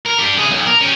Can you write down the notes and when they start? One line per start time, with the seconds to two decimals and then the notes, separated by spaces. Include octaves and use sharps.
0.05 A#4
0.19 D4 G4
0.37 C2 G#4
0.51 B1
0.66 A#4
0.81 C#4 G4